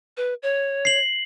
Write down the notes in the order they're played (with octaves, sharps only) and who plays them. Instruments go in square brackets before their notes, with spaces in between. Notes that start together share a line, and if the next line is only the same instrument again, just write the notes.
[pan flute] B4
C#5
[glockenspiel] C7 F#7